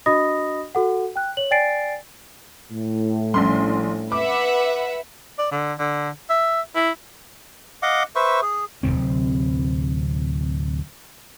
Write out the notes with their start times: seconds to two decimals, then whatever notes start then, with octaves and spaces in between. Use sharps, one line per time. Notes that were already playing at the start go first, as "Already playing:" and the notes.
0.06 D4 F#4 D#5 B5 D#6 A#6
0.75 F#4 A4 F#5
1.16 G5 F#6
1.37 C#5 F#7
1.51 D5 G5 G#5 A6 C7 D7
2.70 A2
3.34 A#1 G3 C#4 C6
4.12 B4 E5 F#5 D6
5.39 D5
5.51 D3
5.79 D3
6.30 E5
6.75 E4
7.83 D#5 F5 F#5 D6
8.16 B4 C5 E5 C#6
8.42 G#4
8.83 D1 A#1 C3 C4